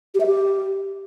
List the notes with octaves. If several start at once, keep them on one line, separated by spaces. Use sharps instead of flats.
G4
E5
G4